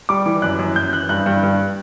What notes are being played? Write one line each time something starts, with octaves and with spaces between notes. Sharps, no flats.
G3 D6
E3
F#2 F#6
F#2
F#2 G6
E3 F#6
G2 F#6
G2
G2